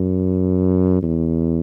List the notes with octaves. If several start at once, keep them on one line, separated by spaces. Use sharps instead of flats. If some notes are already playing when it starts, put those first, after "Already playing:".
Already playing: F#2
E2